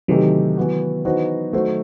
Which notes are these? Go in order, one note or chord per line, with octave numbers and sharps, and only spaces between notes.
C3 D#3 E3 F#3 A3 D#4 G4
E3 B3 F#4
E3 B3 D#4 F#4 C5
A3 D#4 F#4 C5